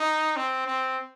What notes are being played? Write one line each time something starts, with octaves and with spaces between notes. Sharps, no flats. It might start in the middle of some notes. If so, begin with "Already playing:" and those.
Already playing: D#4
C4
C4